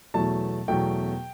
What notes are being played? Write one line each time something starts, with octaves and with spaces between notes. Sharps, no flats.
E2 B2 F#3 A3 A5
E2 B2 F#3 A3 G5